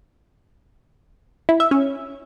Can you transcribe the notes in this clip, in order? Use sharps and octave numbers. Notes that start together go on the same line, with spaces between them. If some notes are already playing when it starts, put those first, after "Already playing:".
E4
E5
C#4